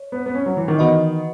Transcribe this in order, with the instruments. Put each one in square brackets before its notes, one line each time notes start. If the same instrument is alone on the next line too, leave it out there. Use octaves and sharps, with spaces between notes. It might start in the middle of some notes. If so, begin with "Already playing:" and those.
Already playing: [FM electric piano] C#5
[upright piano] B3
B3
C#4
F#3
E3
D#3
[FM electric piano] E3 B3 F#4 B4 D#5